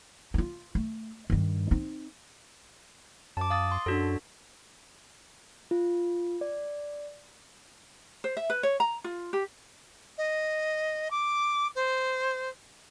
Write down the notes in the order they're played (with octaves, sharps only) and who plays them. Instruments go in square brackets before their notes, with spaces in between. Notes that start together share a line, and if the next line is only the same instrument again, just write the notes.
[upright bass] D#4 F4
A3
G2 D#3
C4 D#4
[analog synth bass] F#2 [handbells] A5 D6
[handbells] F5 D#6 A6
C6
[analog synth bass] F#2 [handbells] D4 F#4 A4
[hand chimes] F4
D5
[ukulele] C5
E5
B4
C#5
A#5
F4
G4
[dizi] D#5
D6
C5